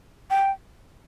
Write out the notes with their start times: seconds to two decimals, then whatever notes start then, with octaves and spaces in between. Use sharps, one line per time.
0.30 G5